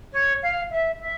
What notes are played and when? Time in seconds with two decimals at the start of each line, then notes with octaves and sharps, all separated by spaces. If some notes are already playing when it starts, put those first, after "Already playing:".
0.13 C#5
0.42 F5
0.71 E5
1.01 E5